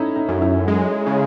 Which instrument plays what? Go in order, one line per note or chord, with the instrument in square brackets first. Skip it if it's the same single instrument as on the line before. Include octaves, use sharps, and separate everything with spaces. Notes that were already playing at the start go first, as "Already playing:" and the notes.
Already playing: [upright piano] A3 C#4 D#4 E4
D#4
[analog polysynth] F#2
[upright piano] E4
[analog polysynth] G#3
C#3